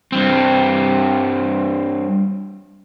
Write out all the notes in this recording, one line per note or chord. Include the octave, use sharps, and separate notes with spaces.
G2 C4